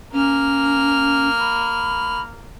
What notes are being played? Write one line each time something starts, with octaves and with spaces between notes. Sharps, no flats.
A#3 C#4 F6
B5